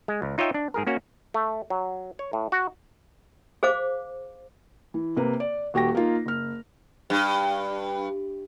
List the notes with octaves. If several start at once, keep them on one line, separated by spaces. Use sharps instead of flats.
G#3
C#2
D#4 F4 C#5 D#5 E5 G5
D4
G#2 G#4 A#4
A#3 C#4 F#4
A3
F#3
C#5
A2
F#4
G#4 C5 F5 D6
E3
C3 A#3 B4
D5
D#1 F#4 G4 G5 A#6
A#3 D#4 F4
F#1 F6
G2